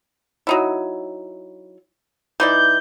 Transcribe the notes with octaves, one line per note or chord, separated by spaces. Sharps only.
F#3 D#4 E4
E3 D#4 D5 G6